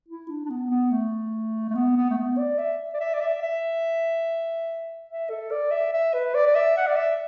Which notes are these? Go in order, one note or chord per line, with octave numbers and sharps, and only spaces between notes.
E4
D4
D4
B3
B3
A3
A3
B3
B3
A3
B3
D5
E5
D5
E5
D5
E5
E5
E5
A4
D5
E5
E5
B4
D5
D5
E5
F#5
D5
E5